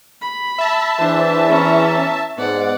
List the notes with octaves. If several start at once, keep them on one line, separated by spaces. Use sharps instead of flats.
B5
E5 A5
E2 E3 D4 C5
C#4 A#5
G#2 B3 D5 F#5